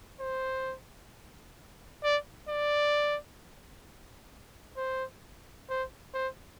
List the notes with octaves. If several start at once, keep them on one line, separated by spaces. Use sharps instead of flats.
C5
D5
D5
C5
C5
C5